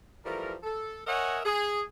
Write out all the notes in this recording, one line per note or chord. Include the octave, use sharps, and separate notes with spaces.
E3 F3 G3 A3 A#4
A4
A#4 C#5 D#5 E5 F#5 G#5
G#4